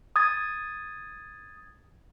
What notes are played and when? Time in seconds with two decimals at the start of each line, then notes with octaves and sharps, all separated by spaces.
0.16 D#6 G#6 A6